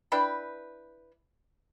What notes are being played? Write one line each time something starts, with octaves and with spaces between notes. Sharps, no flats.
D4 E4 B4 G5